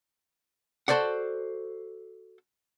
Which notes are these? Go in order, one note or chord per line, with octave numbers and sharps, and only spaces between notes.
F#4 A4 C5 D5 F#5